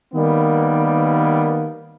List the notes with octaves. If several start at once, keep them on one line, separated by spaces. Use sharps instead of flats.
D#3 G3 A#3 B3